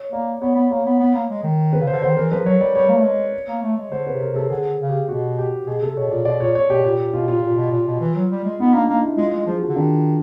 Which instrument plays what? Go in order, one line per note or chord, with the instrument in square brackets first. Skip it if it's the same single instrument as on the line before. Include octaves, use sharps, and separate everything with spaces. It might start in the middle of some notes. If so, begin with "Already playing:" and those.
Already playing: [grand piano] C#5
[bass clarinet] A#3 [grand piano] D5
[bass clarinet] B3 [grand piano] C#5
[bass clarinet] B3
[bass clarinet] A#3 [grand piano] C#5
[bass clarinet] B3
B3
A#3
G#3
D#3
[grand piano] B4
[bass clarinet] C#3
[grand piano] C5
[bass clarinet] D3
[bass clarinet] D#3 [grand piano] C5
[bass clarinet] E3 [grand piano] A#4
[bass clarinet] F3 [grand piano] B4
[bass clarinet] F#3 [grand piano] C#5
[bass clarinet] G3 [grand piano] D5
[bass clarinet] G3 [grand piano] C#5
[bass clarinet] A#3
A3
G#3
A#3
A3
G#3
[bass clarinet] D3 [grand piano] C5
[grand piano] B4
[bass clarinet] C3
[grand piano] A#4
[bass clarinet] C3 [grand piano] A4
[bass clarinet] D3 [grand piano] G#4
[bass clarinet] C#3
[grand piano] G4
[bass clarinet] B2 [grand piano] F#4
[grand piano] G4
[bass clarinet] B2 [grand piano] G#4
[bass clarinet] C3 [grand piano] A4
[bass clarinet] B2 [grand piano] C#5
[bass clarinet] A#2 [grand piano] D5
[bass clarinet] B2 [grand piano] D5
[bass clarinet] A#2 [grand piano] C#5
[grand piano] C#5
[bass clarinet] B2 [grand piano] G4
[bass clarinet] A#2 [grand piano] G4
[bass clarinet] A#2
[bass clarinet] B2 [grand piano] F4
[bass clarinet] A#2 [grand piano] F4
[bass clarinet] A#2
B2
A#2
B2
E3
F#3
G3
G#3
[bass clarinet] B3 [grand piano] D#4
[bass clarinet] A#3 [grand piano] D4
[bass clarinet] A#3 [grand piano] D#4
[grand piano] E4
[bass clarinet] G#3 [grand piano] F4
[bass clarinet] G#3
[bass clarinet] F3 [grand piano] G#4
[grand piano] F#4
[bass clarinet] D3
[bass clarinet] D#3 [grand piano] D4